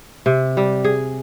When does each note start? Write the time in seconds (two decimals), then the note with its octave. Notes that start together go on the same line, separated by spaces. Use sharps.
0.26 C3
0.57 G3
0.84 G#4